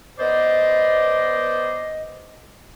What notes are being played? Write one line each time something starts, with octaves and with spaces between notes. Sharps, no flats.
B3 C5 D5 D#5